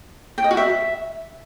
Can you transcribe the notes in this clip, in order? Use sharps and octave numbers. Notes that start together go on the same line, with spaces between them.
G5
D#5
F#4
E5